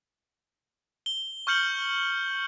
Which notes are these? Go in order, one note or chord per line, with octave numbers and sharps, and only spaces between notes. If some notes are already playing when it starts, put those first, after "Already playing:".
G7
C#6 F6 G6 C#7 F#7 G7